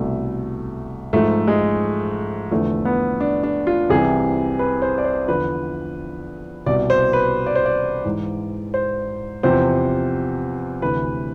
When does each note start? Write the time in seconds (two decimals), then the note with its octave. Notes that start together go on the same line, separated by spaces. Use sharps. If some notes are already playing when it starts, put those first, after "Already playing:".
Already playing: C2 B2 A3
1.13 G#2 F3 A3
1.48 G#3
2.51 E2 D3 F3 A3
2.85 B3
3.20 D4
3.43 D4
3.67 F4
3.89 C2 C3 E3 G#4
4.59 B4
4.82 C5
4.98 D5
5.05 C5
5.28 E2 D3 F3 B4
6.66 C2 B2 D5
6.90 C5
7.13 B4
7.46 D5
7.55 C5
7.66 D5
8.04 G#2 E3
8.74 C5
9.43 E2 C3 F3 C5
10.82 D2 C3 E3 B4